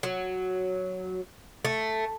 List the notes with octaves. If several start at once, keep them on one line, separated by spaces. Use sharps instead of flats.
F#3
A3